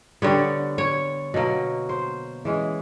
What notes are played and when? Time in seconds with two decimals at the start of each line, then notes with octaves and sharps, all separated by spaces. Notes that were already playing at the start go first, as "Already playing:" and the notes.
0.22 D3 G3 B3 C#5
0.78 C#5
1.34 B2 F#3 A#3
1.89 C5
2.45 E3 G#3 C#4